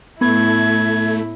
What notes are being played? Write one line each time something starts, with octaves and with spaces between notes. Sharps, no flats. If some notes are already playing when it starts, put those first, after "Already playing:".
A2 A3 B3 E4 G#6